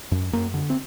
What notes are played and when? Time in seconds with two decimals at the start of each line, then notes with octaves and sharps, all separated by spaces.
0.12 F#2
0.33 F#2 A#3
0.54 D3
0.70 C4